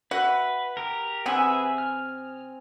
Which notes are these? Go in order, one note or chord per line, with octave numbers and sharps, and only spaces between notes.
F#4 B4 E5 F#5
G4 A#4
C3 C4 G#4 B4 E5 F#5 G#5 D#6
F6